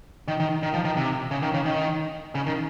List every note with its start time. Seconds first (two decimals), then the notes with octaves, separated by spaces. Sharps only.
0.28 D#3
0.40 D#3
0.63 D#3
0.74 F3
0.85 D#3
0.97 C3
1.31 C#3
1.43 D#3
1.54 C#3
1.65 D#3
2.35 C#3
2.46 D#3